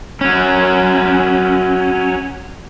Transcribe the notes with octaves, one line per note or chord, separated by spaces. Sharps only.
F#3 C#4